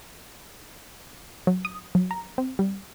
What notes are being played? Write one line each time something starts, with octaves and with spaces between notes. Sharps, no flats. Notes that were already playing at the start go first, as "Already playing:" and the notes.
F#3
D#6
F#3
A#5
C4
G3